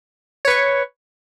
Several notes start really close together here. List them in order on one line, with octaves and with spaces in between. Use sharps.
C#5 B4 C#6